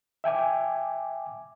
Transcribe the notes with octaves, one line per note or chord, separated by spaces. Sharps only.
E5 G5 G#5 D6